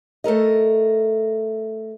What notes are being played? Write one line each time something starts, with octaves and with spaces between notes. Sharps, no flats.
A3 A4 A#4 D#5